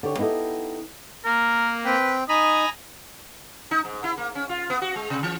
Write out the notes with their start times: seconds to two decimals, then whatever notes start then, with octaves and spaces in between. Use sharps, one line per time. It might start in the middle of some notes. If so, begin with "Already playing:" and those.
0.03 D3 G4 C#5
0.18 B3 D#4 E4 G4 A4
1.25 A#3 A#4
1.85 C4 B4 G5
2.29 D#4 G#5 A#5 B5 D#6
3.71 D#4
3.85 G#2
4.04 E4
4.18 A#3
4.35 C#4
4.49 F4
4.70 B3
4.82 F#4
4.96 G#3
5.10 C3
5.23 E3